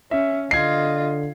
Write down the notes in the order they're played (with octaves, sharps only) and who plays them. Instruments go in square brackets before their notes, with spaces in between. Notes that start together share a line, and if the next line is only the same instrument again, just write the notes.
[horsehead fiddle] C#4 [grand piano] E5
[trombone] D3 [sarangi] F4 [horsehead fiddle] D#5 [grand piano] G#6 C7